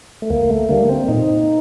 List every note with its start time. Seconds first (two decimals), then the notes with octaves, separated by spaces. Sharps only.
0.22 A3
0.30 D2 A#3
0.50 A3
0.69 D3 G3 A#3
0.89 C4
1.08 A#2 D#4